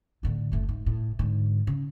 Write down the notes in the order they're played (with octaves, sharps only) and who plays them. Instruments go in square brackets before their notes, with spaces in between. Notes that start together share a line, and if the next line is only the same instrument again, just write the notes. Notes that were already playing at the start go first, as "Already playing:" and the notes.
[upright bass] A2 D3
F#1 A3
G#2
A2
G#2 D3
C#3